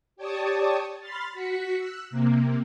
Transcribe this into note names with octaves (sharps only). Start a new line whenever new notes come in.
G4 C#5 D5 A5 C#6 D#6
B5 C6 F6 A6
F#4 B6 C#7
E6 F#6
C3 A#3